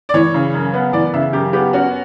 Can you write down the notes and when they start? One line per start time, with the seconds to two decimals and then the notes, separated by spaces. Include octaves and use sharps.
0.09 D5
0.14 E3 C#5
0.34 C#3
0.54 F#2
0.74 B3
0.93 E3 D5
1.14 C#3 E5
1.33 F#2 G4
1.53 B3 G4
1.73 C#4 F#4